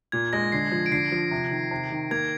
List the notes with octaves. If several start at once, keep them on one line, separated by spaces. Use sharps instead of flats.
A#2 G#6
G#3 A#6
D3 C7
F3
D7
D3 C7
F3
C3
D#3
C3
D#3
A#3 G#6